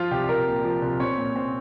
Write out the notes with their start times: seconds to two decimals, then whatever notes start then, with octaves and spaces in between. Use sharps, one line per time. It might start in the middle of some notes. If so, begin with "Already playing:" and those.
Already playing: F3 F4
0.11 C2 G4
0.29 F3 A#4
0.47 A#2
0.64 F3
0.82 C2
1.00 C4 C#5
1.17 A#2
1.36 C4